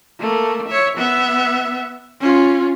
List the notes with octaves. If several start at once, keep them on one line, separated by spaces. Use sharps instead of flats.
A3 A#3
C#5 E5
B3 E5
C#4 F4